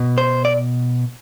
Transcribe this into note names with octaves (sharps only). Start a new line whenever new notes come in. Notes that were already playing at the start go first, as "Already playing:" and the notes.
Already playing: B2
C5
D5